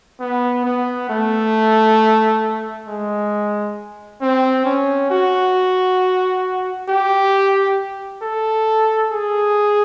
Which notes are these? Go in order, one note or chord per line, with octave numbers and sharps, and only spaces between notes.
B3
B3
A3
G#3
C4
C#4
F#4
G4
A4
G#4